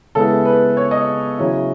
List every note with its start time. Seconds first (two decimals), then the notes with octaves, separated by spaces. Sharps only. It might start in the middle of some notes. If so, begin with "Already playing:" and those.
0.15 C#3 G#3 B3 E4 A4
0.45 B4
0.77 C#5
0.91 D#5
1.38 C#3 F#3 C#4 E4